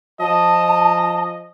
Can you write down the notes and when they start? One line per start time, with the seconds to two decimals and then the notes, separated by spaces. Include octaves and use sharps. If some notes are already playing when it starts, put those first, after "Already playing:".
0.20 F3 D#5 A5